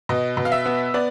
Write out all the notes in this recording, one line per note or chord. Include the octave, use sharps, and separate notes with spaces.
B2 D#5
B2
F5
E5
B3
B3 D5